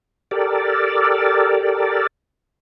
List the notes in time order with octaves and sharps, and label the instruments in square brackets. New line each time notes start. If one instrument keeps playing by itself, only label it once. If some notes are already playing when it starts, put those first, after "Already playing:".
[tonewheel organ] G4 A4 A#4 D5